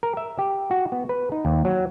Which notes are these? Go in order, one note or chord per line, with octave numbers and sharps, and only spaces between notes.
A#4
E5
G4
F#4
B3
B4
D#4
D#2
F#3